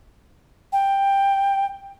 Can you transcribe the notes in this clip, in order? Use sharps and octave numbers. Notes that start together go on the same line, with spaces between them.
G5